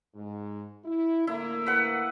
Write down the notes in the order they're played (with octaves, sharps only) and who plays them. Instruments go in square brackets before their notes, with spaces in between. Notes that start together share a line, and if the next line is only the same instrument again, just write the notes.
[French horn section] G#2
E4
[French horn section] A2 D3 A#3 [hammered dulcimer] E4
[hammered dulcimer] B4 F#5